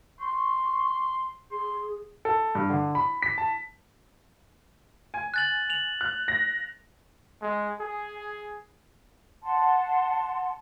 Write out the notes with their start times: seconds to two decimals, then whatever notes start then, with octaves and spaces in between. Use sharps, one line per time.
0.20 C6 C#6
1.51 G#4 C6
2.25 A4
2.55 G2
2.70 D3
2.95 B5
3.22 B6
3.38 A5
5.14 G#5
5.34 F#6 A6 F#7
5.70 F7 F#7
6.01 F#6
6.28 A#6
7.42 G#3
7.80 G#4
9.43 F#5 A5 C6